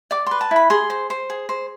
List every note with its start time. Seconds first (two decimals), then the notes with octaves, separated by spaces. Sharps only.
0.11 D5 D6
0.26 B4 C6
0.41 A5
0.51 E4 B5
0.70 G#4 C6
0.90 C5
1.10 C5
1.30 G#4
1.49 C5